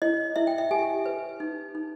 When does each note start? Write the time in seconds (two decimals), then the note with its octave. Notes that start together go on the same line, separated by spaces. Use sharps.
0.02 E4 D#5
0.36 E4 E5
0.47 G5
0.58 E5
0.71 G4 G#5
1.06 B4
1.40 D#4
1.75 D#4